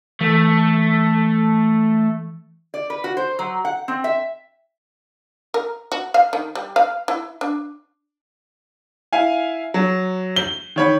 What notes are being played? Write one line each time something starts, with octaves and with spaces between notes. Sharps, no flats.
E3 A3
D5
B4
F#4
C5
F#3
F#5
C4
E5
A#4
F#4
F5
D#3
G3
F5
E4
D4
E4 F5 G#5
F#3
G7
D#3 C#5 B5